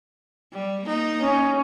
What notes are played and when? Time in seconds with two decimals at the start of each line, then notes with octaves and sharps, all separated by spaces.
0.53 G3
0.84 A#3 D#4
1.21 C#4